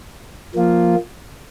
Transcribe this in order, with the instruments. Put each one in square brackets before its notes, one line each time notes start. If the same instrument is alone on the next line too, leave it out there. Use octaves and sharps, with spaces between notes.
[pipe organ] F3 A#3 F4